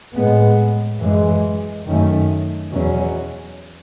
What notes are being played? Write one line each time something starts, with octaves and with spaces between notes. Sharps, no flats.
A2 G#3 B3
F#2 E3 G#3
F#2 D#3 A3 C#4
E2 B2 F#3 C#4